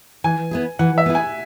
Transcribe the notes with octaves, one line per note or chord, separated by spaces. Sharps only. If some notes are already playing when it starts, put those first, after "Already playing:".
E3 G#5
B3 E4 G#4
E3 F#5
E5
B3 E4 G#4
G#5